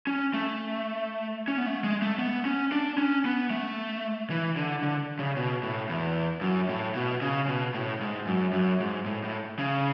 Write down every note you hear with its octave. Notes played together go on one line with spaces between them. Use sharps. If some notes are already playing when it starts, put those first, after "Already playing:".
C#4
A3
C#4
B3
A3
G#3
A3
B3
C#4
D4
C#4
B3
A3
E3
D3
D3
C#3
B2
A2
E2
F#2
A2
B2
C#3
B2
A2
G#2
F#2
F#2
G#2
A2
A2
C#3